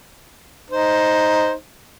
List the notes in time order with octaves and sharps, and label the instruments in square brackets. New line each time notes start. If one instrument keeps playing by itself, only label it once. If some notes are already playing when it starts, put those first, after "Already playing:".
[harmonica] D#4 C5